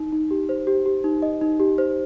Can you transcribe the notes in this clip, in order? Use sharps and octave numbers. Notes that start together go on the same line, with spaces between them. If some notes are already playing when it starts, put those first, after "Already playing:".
Already playing: D#4
D#4
G4
C5
G4
G4
D#4
D#5
D#4
G4
C5